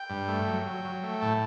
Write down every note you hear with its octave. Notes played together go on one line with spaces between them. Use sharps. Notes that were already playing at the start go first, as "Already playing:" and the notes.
Already playing: G5
G2
A3
F#3
F#3
F#3
A3
A2 A5